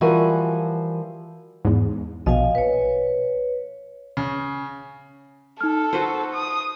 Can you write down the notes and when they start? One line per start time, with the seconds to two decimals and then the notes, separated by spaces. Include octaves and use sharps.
0.01 E3 F3 G3 F#4 A#4 G#5
1.65 E2 G#2
2.26 A#1 B2 D#5 F5 G#5
2.55 B4 C#5
4.17 C#3
5.61 D#4 A4 F6
5.93 F#4 B4 C5
6.34 D#6